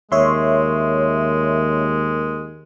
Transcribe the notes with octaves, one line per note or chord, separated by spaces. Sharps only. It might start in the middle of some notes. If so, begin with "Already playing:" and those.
D#2 G#3 A#4 C#5 E5 C6